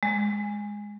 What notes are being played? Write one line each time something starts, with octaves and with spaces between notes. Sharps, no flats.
G#3